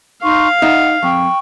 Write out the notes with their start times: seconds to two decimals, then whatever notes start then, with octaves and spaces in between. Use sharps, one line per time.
0.23 D#4 F5 C6 C#6
0.62 D#4 E5 F#5
1.03 F2 G5 C#6